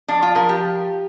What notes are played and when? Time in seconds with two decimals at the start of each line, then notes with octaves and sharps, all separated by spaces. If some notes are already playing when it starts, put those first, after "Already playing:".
0.08 F3 D4
0.22 F4
0.35 F3 A#4
0.49 G4